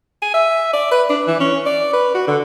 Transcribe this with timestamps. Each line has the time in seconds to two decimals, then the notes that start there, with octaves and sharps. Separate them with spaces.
0.22 G#5
0.34 E5
0.73 D5
0.92 B4
1.10 D4
1.27 E3
1.40 C#4
1.66 D5
1.93 B4
2.15 F#4
2.28 D3